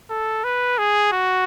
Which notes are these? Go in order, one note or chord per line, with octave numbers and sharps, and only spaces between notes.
A4
B4
G#4
F#4